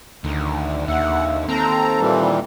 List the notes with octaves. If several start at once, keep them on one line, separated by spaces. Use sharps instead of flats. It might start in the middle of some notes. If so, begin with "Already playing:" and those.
D2 D3 D#3
D#2 E5 F#5
D#2 C4 A4 A#5
A#2 E3 G3